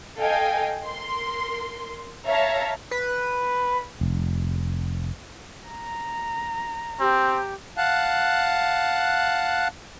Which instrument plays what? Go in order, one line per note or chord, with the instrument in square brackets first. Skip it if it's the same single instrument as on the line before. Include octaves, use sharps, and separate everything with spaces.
[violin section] A4 D#5 F5 G5 G#5
A#4 C6
C#5 E5 F5 A5 A#5
[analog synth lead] B4
[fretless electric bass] F1
[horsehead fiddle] A#5
[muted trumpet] C4 [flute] G4
[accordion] F5 F#5 A5 F#6